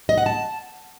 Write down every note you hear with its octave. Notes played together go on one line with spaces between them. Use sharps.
D#5
F#5
A5